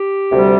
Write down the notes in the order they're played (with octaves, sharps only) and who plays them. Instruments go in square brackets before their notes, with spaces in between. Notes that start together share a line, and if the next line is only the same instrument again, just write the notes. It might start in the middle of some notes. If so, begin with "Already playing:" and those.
Already playing: [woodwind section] G4
D2 C3 G3